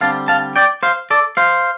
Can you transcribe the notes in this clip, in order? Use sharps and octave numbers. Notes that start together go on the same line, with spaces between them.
D3 G3 C4 F5 A5
F5 A5
D5 G5
C5 F5
A4 D5
C5 F5